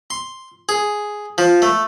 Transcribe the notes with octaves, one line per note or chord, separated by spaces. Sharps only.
C6
G#4
F3
A3